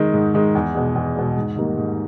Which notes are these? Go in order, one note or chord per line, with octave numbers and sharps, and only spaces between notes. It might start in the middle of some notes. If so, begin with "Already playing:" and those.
Already playing: D#3 G#3
G#2
D#3 G#3
E2
B2 G#3
E2
B2 G#3
G#2
D#3 G3 A#3
G#2